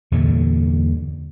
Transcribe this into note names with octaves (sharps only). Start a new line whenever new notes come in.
E2 G2 A#2 D3